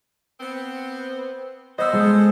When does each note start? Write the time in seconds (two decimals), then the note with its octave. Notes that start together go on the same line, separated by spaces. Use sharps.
0.40 B3 C4
1.78 B3 C5 D#5 E6
1.93 G#3 G#4 A4